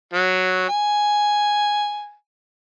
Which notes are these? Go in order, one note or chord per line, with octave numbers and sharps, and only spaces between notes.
F#3
G#5